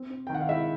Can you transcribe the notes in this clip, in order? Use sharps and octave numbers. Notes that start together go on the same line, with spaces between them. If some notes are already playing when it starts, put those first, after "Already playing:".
Already playing: C4
C4
G5
D#3
F#5
F5
G#3 E4 E5